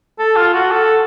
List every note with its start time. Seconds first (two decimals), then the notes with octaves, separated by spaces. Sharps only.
0.19 A4
0.36 F4
0.54 F#4
0.71 A4